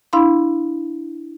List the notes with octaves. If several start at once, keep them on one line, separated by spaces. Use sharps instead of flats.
D4 E4 F5 B5 C6